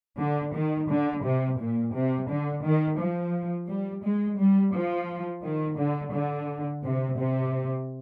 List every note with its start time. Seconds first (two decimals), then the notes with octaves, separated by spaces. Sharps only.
0.19 D3
0.55 D#3
0.89 D3
1.24 C3
1.60 A#2
1.95 C3
2.29 D3
2.64 D#3
3.00 F3
3.68 G3
4.04 G#3
4.39 G3
4.74 F3
5.43 D#3
5.78 D3
6.13 D3
6.84 C3
7.18 C3